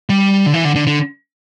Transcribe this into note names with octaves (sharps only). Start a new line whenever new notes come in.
G3
D3
E3
D3
D3
D3